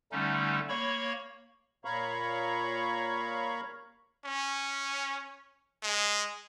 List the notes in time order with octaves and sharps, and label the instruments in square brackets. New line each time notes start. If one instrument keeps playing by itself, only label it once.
[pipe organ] D3 G3 A3 C#4 D#4
A#3 C#5 B5 C#6
[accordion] A#2 C#5 F5 A#5 B5 C#6
[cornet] C#4
G#3